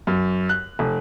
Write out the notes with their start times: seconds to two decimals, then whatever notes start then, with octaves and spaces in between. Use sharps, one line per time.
0.07 F#2
0.49 F#6
0.79 F1